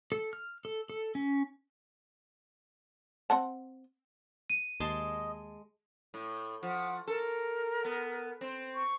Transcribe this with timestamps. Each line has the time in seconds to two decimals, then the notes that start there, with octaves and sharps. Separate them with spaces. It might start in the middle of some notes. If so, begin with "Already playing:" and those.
0.12 A4
0.33 F6
0.65 A4
0.90 A4
1.15 C#4
3.30 C4 F#5 A5
4.50 D#7
4.80 D#2 G#3 D#5 A5 C6
6.14 A2
6.63 F3 F#5
7.08 A4 A#4
7.85 B3
8.41 C4
8.75 C#6